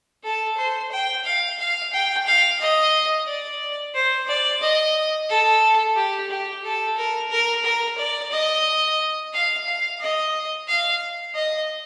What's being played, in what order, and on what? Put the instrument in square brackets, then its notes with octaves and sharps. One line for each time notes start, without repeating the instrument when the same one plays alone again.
[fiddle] A4
C5
G5
F5
F5
G5
F5
D#5
D5
C5
D5
D#5
A4
G4
G4
A4
A#4
A#4
A#4
D5
D#5
F5
F5
D#5
F5
D#5